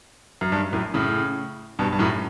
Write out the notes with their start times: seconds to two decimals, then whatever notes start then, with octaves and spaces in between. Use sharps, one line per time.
0.41 F#2
0.52 G2
0.73 F#2 A2
0.94 A2 C#3
1.79 G2 B2
1.93 G2
1.99 F#2 A2